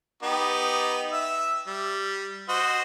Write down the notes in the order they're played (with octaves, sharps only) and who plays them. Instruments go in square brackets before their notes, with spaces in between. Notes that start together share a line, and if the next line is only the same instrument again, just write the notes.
[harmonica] B3 D#4 G4
E5 E6
G3
F#4 C5 D#5